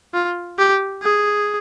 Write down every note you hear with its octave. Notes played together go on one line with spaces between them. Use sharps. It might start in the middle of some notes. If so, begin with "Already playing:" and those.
F4
G4
G#4